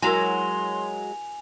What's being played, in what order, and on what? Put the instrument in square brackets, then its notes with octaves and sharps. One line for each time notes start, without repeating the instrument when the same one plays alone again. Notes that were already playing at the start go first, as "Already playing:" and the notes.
[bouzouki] F#3 G#3 [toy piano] E4 F#4 A#4 [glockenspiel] G#5 F7 [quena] C6